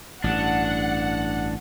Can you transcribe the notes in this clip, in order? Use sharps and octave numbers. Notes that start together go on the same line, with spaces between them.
A1 G2 D4 F#5